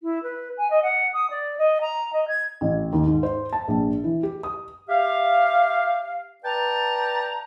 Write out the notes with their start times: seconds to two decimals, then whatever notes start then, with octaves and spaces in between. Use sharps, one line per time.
0.01 E4
0.22 B4
0.57 G#5
0.70 D#5
0.82 F#5
1.13 D#6
1.30 D5
1.58 D#5
1.81 A#5
2.12 D#5
2.28 G#6
2.61 A1
2.93 D#2
3.06 G#2
3.23 C5
3.53 A5
3.68 A#1
4.04 E3
4.23 G4
4.43 D#6
4.89 G4 E5 F5
6.44 B4 D5 G5 A5 A#5